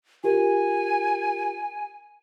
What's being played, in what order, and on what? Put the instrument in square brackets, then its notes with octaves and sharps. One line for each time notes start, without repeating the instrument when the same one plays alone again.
[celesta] F4 G4 A#4 [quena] G#5